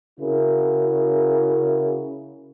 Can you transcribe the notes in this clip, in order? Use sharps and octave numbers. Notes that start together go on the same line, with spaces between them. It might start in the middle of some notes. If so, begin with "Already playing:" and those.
C#3 E4 F#4 A#4